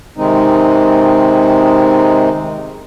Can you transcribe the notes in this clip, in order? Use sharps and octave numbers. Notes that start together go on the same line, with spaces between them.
C3 D#3 G#3 C4 D#4